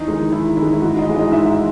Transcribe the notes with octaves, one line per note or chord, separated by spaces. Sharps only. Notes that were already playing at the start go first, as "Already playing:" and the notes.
Already playing: E2 D#4
D#3 G#3
E2 E4
D#3 E4
G#3
E4
G#2 F#4
D#5
E3 G#3
D#5
G#2 E5